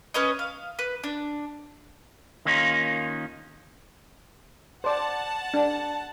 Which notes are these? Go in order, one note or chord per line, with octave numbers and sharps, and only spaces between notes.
C#4 B4 C#5 D#5
F5
B4
D4
D#3 A#3 C#4 D#4 F4
C5 D5 F#5 A5
D4